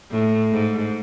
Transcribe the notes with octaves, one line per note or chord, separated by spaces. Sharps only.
A2
G#2